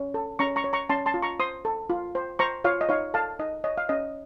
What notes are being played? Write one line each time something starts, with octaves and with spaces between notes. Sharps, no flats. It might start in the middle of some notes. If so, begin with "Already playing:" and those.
Already playing: C#4
A4
C#4 A#5 C#6
A#5 C#6
C#5
A#5 C#6
C#4 A5 C6
A5 C6
F4
A#5 C#6
C5 C6 D#6
A4
F4
C5
C5 A#5 C#6
F4 C#5 F5
D#5
D#4 C#5 F5
A4 F5 A5
D#4 D#5
C#5 D#5
F5
C#4 D#5